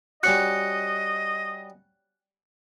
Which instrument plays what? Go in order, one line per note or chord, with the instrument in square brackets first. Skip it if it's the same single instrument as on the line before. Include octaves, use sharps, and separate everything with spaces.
[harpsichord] G3 C#4 F#4 [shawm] D#5 [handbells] F#6 C#7